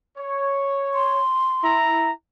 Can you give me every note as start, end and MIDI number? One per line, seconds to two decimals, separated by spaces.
0.17 1.20 73
0.94 1.77 84
1.64 2.10 64
1.64 2.10 82